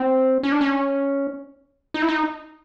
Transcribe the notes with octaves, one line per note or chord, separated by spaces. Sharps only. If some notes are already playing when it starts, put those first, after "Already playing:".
Already playing: C4
C#4
D4
C#4
D#4
E4
D#4